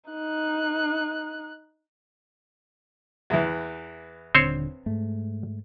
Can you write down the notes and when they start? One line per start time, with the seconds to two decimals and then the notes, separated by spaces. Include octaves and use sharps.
0.11 D#4 F#6
3.30 E2 E3
4.35 D#1 D3 C4 C5 C#5
4.86 G#2 A3